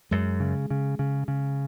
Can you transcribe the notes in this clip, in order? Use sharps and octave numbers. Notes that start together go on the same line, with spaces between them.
F#2 G#3
C#3
C#3
C#3
C#3